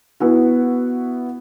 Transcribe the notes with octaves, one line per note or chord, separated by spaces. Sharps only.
B3 E4 F#4